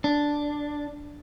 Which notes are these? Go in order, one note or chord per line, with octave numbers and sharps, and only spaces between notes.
D4